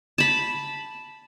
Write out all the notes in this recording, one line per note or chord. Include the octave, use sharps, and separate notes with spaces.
A5 B5